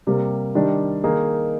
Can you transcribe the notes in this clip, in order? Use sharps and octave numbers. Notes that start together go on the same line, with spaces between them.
C3 G3 A#3
D#3 G3 D4 G4
D#3 A#3 D#4 G#4